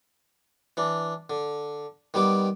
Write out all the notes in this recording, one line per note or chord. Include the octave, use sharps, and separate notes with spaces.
E3 D4
D3
D#3 G3 B3 D6